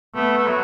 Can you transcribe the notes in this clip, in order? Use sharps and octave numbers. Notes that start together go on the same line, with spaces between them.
A3 B3
A3
F#3